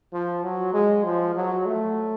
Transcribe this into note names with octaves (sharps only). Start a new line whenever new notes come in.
F3
F#3
G#3
F3
F#3
A3